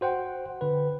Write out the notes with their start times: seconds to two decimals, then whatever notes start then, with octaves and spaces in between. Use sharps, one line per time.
0.01 F#4 C5 F#5 G5
0.61 D3 B4